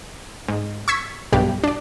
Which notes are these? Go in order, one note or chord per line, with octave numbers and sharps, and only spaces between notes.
G#2
C#6 E6 G#6 B6
B1 G2 G4
D4 D5